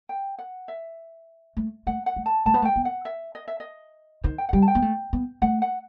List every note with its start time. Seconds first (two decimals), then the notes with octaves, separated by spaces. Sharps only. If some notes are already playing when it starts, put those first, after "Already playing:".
0.09 G5
0.39 F#5
0.68 E5
1.57 A3
1.87 A3 F#5
2.06 F#5
2.16 A3
2.26 A5
2.46 A3 A5
2.54 B3
2.62 A3
2.65 G5
2.76 B3
2.85 F#5
3.05 E5
3.35 D#5
3.48 E5
3.60 D#5
4.24 D#3 C5
4.38 G5
4.49 F#5
4.53 G3 G5
4.62 A5
4.68 G5
4.75 B3
4.82 A3
5.13 B3
5.42 A3 F#5
5.62 F#5